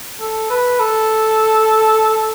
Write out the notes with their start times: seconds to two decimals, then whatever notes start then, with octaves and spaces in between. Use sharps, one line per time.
0.21 A4
0.50 B4
0.80 A4